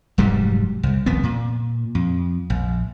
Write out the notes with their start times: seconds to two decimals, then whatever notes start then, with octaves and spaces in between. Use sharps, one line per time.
0.18 F1 G#2 F#3 G3
0.83 C2
1.06 D#1 A#1 F2 B3
1.23 A#2
1.95 F2
2.50 A#1